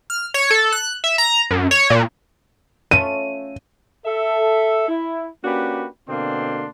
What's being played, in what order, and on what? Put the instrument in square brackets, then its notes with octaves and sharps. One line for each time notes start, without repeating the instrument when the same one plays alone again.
[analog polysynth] F6
C#5
A4
F#6
E5
A#5
F#2
C#5
A#2
[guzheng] A3 C#4 F4 [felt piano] D#7
[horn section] A4 E5
E4
A#3 C#4 D4 F#4 G4 B4
B2 D3 A#3 C4 D4 C6